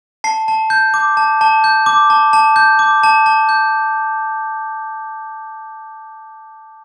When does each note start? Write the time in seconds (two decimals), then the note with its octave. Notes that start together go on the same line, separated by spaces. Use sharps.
0.24 A5 C7
0.48 A5
0.70 G6
0.94 D6
1.17 A5
1.41 A5
1.64 G6
1.86 D6
2.10 A5
2.33 A5
2.56 G6
2.79 D6
3.03 A5
3.26 A5
3.49 G6